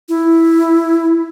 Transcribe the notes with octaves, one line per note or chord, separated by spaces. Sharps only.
E4